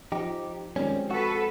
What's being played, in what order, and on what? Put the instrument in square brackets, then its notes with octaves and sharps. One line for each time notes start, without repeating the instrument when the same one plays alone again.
[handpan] F3 [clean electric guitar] D#4 G4
[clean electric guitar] D#3 G3 C#4 [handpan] G#3 C4
[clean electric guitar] F#4 [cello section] A4 B4